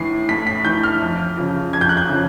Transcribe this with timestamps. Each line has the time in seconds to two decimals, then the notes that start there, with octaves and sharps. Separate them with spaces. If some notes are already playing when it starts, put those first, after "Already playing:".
Already playing: A2 E3 C7
0.28 A2 B6
0.47 B6
0.65 E3 G6
0.83 F6
1.01 F2
1.37 C#3 F3
1.73 F2 G#6
1.81 G6
1.89 F#6
1.97 G6
2.10 C#3 F3